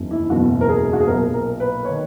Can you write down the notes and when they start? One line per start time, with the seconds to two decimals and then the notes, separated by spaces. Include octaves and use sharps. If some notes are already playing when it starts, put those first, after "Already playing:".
Already playing: F#1 E2 D#3 F#3
0.11 E4
0.30 F#1 E2 B2 F#3 F#4
0.61 A#4
0.69 G#4
0.93 F#4
1.00 G#4
1.07 B1 A#2 F#3 A#4
1.34 A#4
1.60 B4
1.85 D#3 C#5